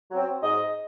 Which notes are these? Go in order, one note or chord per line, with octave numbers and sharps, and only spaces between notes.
F#3 C4
G#2 D#5